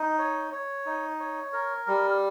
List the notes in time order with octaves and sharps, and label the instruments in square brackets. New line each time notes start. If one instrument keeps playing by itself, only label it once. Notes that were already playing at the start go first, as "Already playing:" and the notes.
Already playing: [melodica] D#4
C#5
C#5
D#4
C#5
A#4
G3